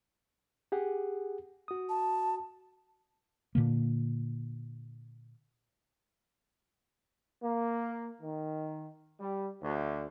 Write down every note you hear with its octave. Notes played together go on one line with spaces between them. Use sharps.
G4 G#4 F#5
F#4 D#6
A5
A#2 D3 A#3
A#3
D#3
G3
D2